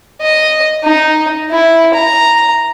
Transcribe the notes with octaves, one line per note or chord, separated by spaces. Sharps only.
D#5
D#4
E4
A#5